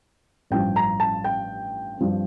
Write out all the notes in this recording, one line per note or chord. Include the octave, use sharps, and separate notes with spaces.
A1 G2 F3 G5
A#5
A5
G5
G2 F3 C4